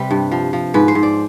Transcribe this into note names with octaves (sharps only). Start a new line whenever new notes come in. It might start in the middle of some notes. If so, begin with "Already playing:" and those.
Already playing: C3 G3 B4
G2
F3
F3
G#2 B4
C5
G#2
D5